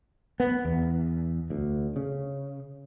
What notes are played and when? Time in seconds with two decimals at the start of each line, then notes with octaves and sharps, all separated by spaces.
0.40 B3
0.65 E2
1.50 D2
1.96 C#3